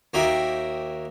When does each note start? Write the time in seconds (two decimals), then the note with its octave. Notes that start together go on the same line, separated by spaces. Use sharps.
0.14 D#2 A#3 D#4 F#4 E5 G5